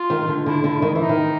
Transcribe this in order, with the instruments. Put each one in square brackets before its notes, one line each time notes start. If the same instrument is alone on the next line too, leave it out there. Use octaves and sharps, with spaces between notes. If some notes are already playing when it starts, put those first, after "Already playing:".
Already playing: [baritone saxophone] F4
[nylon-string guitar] D#3
D3
[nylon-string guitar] D3 [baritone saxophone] E4
[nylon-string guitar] D3
D#3
[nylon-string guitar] E3 [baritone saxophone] D#4
[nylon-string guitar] D#3